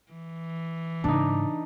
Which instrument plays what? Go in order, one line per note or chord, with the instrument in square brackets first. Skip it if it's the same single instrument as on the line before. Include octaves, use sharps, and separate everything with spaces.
[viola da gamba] E3
[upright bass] G#2 C#3 [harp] D4 D#4